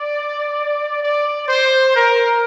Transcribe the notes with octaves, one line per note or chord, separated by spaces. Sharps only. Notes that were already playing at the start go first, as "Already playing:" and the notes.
Already playing: D5
D5
C5
A#4